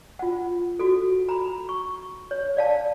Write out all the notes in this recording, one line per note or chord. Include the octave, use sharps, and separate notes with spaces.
F4 F#5
F#4 A4
A#5 B5
C#6
C#5
D5 F5 A5